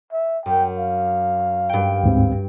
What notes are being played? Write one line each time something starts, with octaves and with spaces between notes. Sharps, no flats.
E5
F#2 G5
F5
G2 G5
D2 G#2 C4